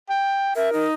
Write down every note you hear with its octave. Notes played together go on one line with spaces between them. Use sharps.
G5
A#4 E5
D#4